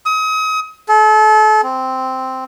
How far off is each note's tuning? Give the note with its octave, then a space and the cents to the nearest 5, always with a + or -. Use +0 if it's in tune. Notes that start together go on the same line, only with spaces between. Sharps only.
D#6 +35
A4 -35
C4 -5